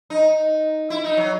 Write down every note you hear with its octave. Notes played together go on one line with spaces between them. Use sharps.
D#4
E4
D#4
F#3